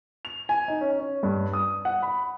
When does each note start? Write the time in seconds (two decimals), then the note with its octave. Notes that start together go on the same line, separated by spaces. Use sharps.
0.25 F7
0.49 G#5
0.68 D#4
0.81 C#4
1.00 C#4
1.23 G2
1.54 D#6
1.85 F#5
2.02 B5